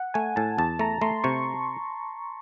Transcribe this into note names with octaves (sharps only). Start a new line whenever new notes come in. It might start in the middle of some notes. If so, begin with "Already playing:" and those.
Already playing: F#5
A3 G#5
A2 A5
E2 A5
A3 A#5
A3 C6
C3 C#6